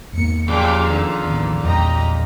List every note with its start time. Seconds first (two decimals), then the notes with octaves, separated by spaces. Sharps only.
0.13 G#1 E2 A#3 C#7
0.48 F2 A#2 C#3 G4 G5 D6
0.86 D3 D#3 B3
1.25 A1 D#2
1.63 A#1 E2 G#3 G4 D#5 A#5